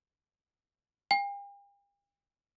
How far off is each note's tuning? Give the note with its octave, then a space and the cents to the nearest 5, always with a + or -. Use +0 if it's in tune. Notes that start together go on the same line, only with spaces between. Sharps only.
G5 +45